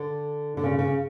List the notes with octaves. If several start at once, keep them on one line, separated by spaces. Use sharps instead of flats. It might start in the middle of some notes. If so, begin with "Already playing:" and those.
Already playing: D3
D3
C#3
C#3